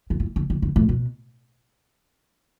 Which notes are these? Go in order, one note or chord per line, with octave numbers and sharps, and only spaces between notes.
D3
E3
D3
D3
D3
A2
B2